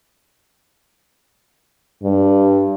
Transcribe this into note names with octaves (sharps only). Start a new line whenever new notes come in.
G2